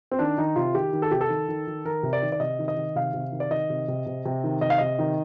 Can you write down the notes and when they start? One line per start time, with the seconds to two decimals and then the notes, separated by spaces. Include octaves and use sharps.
0.11 C4
0.19 D#3 D4
0.38 D#3 D#4
0.56 C3 F4
0.74 D#3 G4
0.93 D#3
1.02 A4
1.11 C3 G4
1.21 A4
1.29 D#3
1.48 D#3
1.67 D#3
1.85 D#3 A#4
2.03 C3
2.13 D5
2.22 D#3
2.32 D5
2.40 C3 D#5
2.59 D#3
2.68 D#5
2.77 D#3
2.95 C3 F5
3.14 C3
3.32 D#3
3.40 D5
3.50 D#3 D#5
3.70 C3
3.88 C3
4.06 C3
4.25 C3
4.44 D#3
4.61 C3 D#5
4.70 F5
4.78 C3 D#5
4.99 D#3